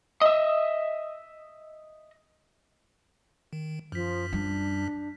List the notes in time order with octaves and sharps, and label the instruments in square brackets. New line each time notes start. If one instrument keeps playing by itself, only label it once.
[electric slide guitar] D#5 E5
[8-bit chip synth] D#3
[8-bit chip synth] F#2 B6 [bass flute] F3
[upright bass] G3 [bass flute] D4